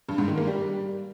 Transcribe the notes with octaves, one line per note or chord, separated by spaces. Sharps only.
G2
G#2
D#3
A#3
G3